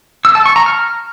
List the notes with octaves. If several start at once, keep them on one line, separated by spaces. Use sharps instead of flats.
E6
A5
C#6
A#5
F6